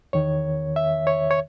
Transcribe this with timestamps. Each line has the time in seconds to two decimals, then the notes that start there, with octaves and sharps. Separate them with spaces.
0.13 E2 D#3 C#5
0.76 E5
1.07 C#5
1.31 C#5